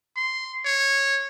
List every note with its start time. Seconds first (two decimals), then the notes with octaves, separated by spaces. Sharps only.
0.16 C6
0.65 C#5